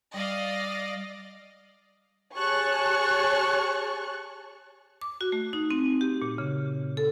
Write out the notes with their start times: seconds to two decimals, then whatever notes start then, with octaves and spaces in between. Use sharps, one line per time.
0.14 G3 D5 D#5 F5
2.37 G4 G#4 C#5 A5 C#6 F#6
5.01 D6
5.21 F#4
5.32 A3
5.53 D#4
5.71 C4
6.01 G4
6.22 A#2
6.38 C#3
6.97 A4